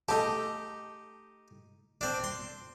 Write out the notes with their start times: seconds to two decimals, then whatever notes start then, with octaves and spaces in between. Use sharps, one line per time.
0.09 A3 D#4 G4 A5
2.01 C4 D4
2.24 C6